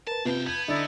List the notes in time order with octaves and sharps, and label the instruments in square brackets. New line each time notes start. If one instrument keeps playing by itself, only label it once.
[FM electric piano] A#4 B4 [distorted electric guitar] A5
[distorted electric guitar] F#2 G5 [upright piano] C3 [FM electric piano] F4 B4 A5
[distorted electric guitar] B3 [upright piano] G6 [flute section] G#6
[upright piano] D3 [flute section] D#4 E4 D5 [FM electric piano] D#5